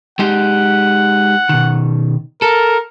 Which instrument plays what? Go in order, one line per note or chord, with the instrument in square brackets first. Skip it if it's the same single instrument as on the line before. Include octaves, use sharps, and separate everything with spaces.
[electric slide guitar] G#3 D#4 G4 [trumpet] F#5
[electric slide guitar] B2 D#3
[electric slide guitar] A4 [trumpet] A#4